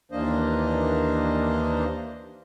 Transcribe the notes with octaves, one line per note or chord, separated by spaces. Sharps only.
D#2 E3 A#3 D4 C5 D#5